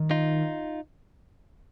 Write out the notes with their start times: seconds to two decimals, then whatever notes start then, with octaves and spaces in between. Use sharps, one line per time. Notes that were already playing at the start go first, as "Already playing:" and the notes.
Already playing: D#3
0.11 D#4 F4